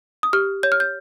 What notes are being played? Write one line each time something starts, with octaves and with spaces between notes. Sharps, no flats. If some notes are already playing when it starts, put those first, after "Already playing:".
D#6
G4 F6
C#5 G6
F6
G6